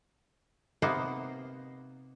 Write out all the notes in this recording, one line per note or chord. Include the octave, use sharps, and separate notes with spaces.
C3 A#3 B3 D#4 C5